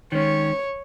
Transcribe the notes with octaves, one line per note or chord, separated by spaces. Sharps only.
D#3 G#3 C#4 C#5